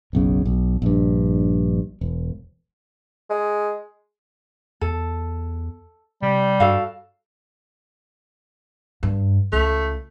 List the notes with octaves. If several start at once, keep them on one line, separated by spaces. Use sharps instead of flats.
F#1 B1 C#3
B1
A#1 G2
E1
G#3
E2 A4
C3 G3
G2 F#4 A4 F5
G2
C#2 A3